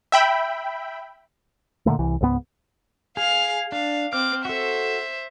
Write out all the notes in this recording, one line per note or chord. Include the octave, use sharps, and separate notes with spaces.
E5 G5 B5
A#2 D3 G3 A3
C2 E3
C#2 G#2 F#3 B3
G#4 F5 F6
D4 F5
C4 D6 F6
F#4 A4 C5 E5